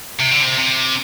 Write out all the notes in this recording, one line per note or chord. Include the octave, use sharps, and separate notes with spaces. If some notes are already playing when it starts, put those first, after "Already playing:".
C3
D3
C3
C3